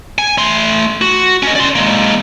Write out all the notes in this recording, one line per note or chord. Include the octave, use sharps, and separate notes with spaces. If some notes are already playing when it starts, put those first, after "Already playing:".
G#5
A3 C6
F#4
C#4 D#5
D5 C6
G#3 A#3